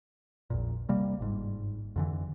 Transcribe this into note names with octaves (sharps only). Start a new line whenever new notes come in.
A#1 E2 A#2
C3 G3 A#3
G1 G#2
F2 D3 E3